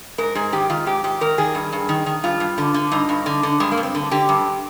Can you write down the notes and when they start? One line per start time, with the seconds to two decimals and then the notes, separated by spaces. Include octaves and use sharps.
0.18 G#2 A#4
0.35 G#2 G#4
0.52 D#3 G4
0.70 D#3 F4
0.87 G#2 G4
1.04 G#2 G4
1.21 D#3 A#4
1.38 D#3 G#4
1.55 G2
1.72 G2
1.89 D#3
2.06 D#3
2.24 G2 F4
2.40 G2
2.58 D3
2.74 D3
2.92 G2 D#4
3.09 G2
3.26 D3
3.43 D3
3.60 G2 G#3
3.72 A#3
3.77 G2
3.83 C4
3.95 D3
4.11 D3 G4
4.29 G2